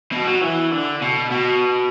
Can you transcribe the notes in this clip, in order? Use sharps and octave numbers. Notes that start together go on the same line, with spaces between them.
B2
F#3
E3
D3
B2
B2